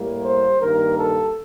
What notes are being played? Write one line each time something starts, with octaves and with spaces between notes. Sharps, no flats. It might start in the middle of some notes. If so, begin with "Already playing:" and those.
Already playing: A2 G3 A#3
C5
G2 D#3 A#3 A#4
A4